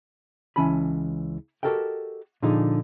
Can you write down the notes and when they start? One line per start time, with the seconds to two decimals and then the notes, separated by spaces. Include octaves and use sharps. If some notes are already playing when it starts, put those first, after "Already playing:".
0.56 C#2 E3 C#4 G#5 A5 B5
1.63 F#4 G4 A4 A#4 D#5 G5
2.42 A#2 D3 F3 D#4 G#4